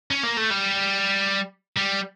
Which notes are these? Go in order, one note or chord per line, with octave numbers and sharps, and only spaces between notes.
C#4
A#3
A3
G3
G3